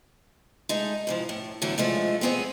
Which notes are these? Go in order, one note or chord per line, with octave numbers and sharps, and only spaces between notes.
G#3 A3 D#4
G#2 E3 F3
A2
A2 D3 E3 F#3 A3 B3
G2 F3 G#3 A3
G#3 B3 C4 G#4 C#5